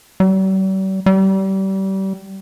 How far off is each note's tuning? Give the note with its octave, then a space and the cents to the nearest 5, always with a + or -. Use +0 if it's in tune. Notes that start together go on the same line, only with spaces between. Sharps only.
G3 -45
G3 -30